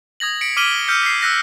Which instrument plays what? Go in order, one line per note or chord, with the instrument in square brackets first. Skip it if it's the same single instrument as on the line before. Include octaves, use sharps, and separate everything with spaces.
[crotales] D#6 G#6 A#6 F#7
B6 C#7 D7
D6 F6 B6 D#7 F#7 G7
E6 F6 G6 B6 C#7
B6 C7
E6 F#6 A#6 B6